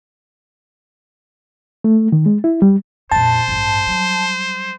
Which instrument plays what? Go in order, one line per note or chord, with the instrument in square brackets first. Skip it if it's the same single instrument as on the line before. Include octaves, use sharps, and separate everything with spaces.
[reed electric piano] A3
D#3
G#3
E4
G3
[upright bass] F2 A#2 [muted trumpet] C5 [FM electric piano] A5
[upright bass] A1 G2
F#3 G3